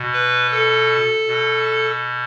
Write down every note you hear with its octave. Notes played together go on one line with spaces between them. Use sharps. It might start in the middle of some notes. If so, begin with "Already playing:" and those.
Already playing: B2
B4
A4
B2